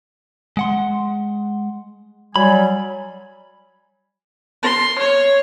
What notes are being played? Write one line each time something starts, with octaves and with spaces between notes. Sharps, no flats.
G#3 F#5 C6
F#3 G3 G#5 B5
C6
C#5